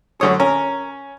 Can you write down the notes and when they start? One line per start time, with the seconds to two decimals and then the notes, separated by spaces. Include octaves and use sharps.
0.21 F#2 D3 C#5 D#6
0.40 C#4 A#4